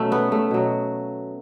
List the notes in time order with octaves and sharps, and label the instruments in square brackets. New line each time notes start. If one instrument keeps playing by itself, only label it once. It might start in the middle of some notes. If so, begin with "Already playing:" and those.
Already playing: [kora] B2 F#3 A3 C#4
B3
A3
B2 F#3